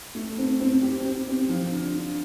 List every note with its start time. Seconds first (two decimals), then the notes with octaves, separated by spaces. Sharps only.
0.15 A3
0.38 C4
0.60 C4
0.82 G4
1.05 C4
1.27 C4
1.49 F3
1.71 D3
1.94 D3